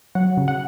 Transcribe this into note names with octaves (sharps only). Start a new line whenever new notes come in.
F#3 F#5
C#3
F#5